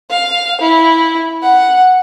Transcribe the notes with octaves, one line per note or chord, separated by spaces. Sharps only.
F5
E4
F#5